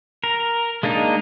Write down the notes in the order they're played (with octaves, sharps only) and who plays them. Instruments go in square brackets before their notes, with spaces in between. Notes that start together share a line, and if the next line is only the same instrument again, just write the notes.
[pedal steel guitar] A#4
G#3 A#3 D4 D#4